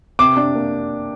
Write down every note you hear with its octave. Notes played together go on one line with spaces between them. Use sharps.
C3 D6
D4
A#3